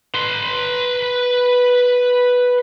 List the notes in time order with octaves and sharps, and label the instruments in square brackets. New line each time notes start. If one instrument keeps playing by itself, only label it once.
[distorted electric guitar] B4 C6